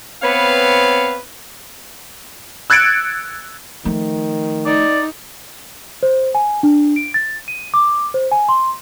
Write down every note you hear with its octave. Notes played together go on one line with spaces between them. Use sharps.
B3 C4 B4 C#5 F5
E6 F#6 G#6 A6 C#7 D7
D#3 F3 A3
D#4 D5
C5
G#5
D4
D7
A6
D#7
D6
C5
G#5
C6